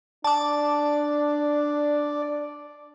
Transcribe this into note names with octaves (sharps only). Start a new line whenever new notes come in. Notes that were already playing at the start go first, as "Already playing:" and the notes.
D4 D5 A5 D6